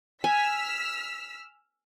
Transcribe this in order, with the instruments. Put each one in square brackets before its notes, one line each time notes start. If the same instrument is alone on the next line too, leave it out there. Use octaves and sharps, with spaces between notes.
[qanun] G#5 [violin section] E6 F6 B6